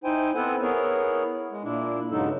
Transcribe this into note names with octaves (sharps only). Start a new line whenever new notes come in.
D#4 E4 C5 G5 G#5
B3 C4 A4 F#5 G#5
B3 E4 G#4 A#4 C#5
G#3
A#2 D4 E4
G2 C#3 F#3 G#3 D#4 A4